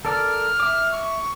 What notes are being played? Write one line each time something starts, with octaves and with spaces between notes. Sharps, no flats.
A4 A#4 D5 F6
E5 D6
C#6